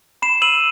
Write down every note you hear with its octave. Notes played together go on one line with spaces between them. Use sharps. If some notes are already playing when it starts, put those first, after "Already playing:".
B5 C7 E7
E6 D#7 F#7